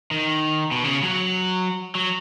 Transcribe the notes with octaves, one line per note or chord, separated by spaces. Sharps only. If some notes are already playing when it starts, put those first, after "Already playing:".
D#3
B2
C#3
F#3
F#3